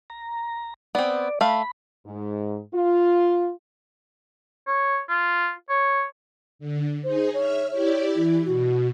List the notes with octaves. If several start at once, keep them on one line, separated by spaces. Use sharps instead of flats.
A#5
B3 C4 D5
A3 F5 B5
G#2
F4
C#5
F4
C#5
D3
D#4 G#4 C5
C#5 E5 F6
E4 G4 C#5 D5
E3 E4
B2 F#4